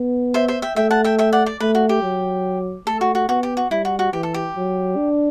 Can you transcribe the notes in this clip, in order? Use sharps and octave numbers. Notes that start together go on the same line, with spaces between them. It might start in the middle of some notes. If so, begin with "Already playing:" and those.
Already playing: B3
C5 E5
C5 E5
E5 G5
A3 E5 G5
F#5 A5
E5 G5
E5 G5
D5 F#5
D5
A3 B4
F#4
G4
F#3
A3 A4
F#4
F#4
B3 F#4
G4
F#4
G3 E4
F#4
F#4
E3 G4
A4
G4
F#3
D4